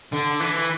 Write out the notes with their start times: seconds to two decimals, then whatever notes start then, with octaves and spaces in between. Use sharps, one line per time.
0.12 D3
0.40 E3